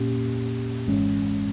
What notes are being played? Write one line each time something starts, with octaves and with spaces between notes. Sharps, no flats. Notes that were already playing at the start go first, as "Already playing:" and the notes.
Already playing: A#2 A#3 C#4 G4
G#1 G#2 E3 G#3 C#4